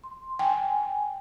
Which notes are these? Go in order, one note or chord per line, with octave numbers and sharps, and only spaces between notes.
C6
G5 G#5